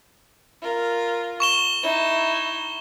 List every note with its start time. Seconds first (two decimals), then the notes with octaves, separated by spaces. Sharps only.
0.62 F4 A#4
1.40 C#6 E7 G7
1.83 D#4 E4